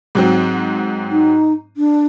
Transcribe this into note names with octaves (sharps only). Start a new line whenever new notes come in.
G#2 F#3 C4
D#4
D4